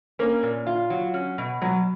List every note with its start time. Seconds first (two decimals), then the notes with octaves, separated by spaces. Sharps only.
0.19 A#3 C#4
0.43 A#2
0.67 F4
0.90 F#3
1.14 C#4
1.38 B2
1.61 B2 F#3